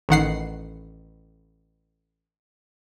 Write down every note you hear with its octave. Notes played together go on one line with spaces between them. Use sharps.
A1 D#3 F#5 C7